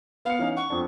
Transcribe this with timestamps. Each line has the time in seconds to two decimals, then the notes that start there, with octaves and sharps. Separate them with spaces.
0.25 B3 F5 C#7
0.39 E3 C#4 D#4
0.57 F#5 C#6
0.70 F2 C4 D4